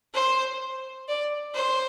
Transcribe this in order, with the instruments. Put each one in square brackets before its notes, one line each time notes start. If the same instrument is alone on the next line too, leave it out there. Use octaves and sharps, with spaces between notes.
[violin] C5
D5
C5